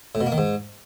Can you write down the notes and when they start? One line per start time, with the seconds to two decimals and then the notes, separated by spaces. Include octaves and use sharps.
0.15 A2
0.21 B2
0.26 A#3
0.32 D#3
0.38 G#2